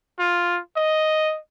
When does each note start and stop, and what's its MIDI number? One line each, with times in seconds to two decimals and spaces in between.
0.19 0.60 65
0.77 1.38 75